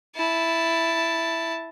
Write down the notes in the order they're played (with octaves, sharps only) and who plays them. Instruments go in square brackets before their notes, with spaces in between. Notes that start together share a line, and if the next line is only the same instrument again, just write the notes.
[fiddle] E4 A5